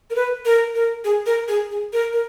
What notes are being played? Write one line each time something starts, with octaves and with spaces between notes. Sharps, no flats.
A#4
B4
A#4
A#4
G#4
A#4
G#4
G#4
A#4
A#4